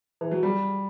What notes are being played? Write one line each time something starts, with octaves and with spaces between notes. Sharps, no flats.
E3
F#3
G3